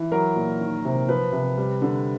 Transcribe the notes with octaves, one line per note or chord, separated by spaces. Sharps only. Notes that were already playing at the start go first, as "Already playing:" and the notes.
Already playing: E3
F#3 A#4
A#2
D#3
C3
F3 B4
C3
G3
D3